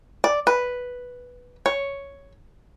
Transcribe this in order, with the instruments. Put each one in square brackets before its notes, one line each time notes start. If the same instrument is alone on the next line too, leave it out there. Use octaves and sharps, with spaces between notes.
[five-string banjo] D5
B4
C#5